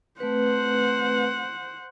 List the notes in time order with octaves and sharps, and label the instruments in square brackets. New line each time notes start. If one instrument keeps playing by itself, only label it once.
[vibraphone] A3 C4 B4 [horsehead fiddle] C5 F#5